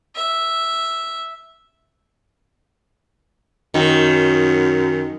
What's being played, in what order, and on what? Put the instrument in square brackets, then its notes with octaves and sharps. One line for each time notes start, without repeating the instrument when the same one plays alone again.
[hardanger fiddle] E5
[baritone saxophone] F#2 [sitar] D#3